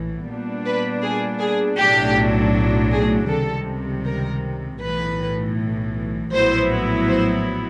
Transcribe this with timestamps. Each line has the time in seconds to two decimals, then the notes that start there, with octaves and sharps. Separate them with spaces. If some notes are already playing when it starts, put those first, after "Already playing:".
Already playing: A#1 A2 E3
0.27 A#2 G3 B3 D4
0.65 B4
1.03 G#4
1.40 G#4
1.78 B1 A2 F#3 A3 D4 G4
2.92 G#4
3.30 C#2 C3 D#3 G3 A4
4.06 A#4
4.82 B1 A2 E3 B4
6.33 A#1 A2 F#3 B3 E4 C5
7.09 C5